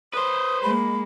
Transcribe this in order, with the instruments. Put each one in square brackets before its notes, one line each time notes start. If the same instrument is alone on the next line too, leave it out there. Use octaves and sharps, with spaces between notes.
[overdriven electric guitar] B4 C5 [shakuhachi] D#6
[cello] G#3 A#3 [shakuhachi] B5